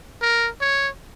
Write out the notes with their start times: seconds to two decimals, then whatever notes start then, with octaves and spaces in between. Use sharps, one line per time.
0.22 A#4
0.61 C#5